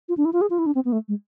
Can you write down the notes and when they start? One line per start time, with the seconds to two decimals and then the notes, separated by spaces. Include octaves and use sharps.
0.09 F4
0.17 D4
0.25 E4
0.33 F4
0.41 G#4
0.50 F4
0.59 E4
0.66 D4
0.75 C4
0.85 B3
0.92 A3
1.08 G#3